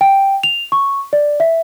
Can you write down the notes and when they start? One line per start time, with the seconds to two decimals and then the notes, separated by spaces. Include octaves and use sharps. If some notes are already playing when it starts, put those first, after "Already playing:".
0.01 G5
0.43 F7
0.72 C#6
1.13 D5
1.40 E5